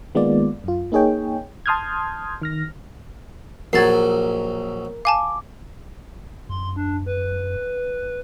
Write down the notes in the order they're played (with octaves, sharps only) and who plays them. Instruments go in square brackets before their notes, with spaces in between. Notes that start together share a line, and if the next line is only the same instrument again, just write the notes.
[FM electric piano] D#3 G#3 A#3 B3 F4 D5
F#2 F4
A#3 D#4 G#4 C#5 G5
A5 C6 D#6 F6 G6 G#6
D#3 F6 A#6
[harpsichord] A#1 F#3 [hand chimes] A#4 [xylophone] G#6 A6 C7
[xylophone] F5 G#5 A5 [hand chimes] D6
[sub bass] F#2 [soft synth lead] C6
[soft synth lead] D4
B4